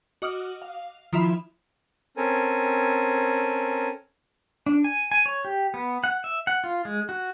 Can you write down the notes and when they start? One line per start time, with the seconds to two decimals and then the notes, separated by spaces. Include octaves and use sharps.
0.22 F#4 D#5 D6 D#6 F6
0.62 F5
1.13 D#3 F3 E4 F4 E5 B5
2.17 C4 C#4 A4 A#4 G#5
4.66 D4
4.84 G#5
5.12 G#5
5.26 C#5
5.45 G4
5.74 B3
6.04 F#5
6.24 E5
6.47 F#5
6.64 F4
6.85 G#3
7.09 F#4